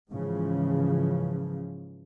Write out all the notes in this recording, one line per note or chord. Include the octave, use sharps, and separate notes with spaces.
G#2 C#3 E3 F3